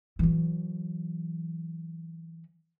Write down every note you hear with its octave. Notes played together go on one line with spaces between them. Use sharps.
E3 F#3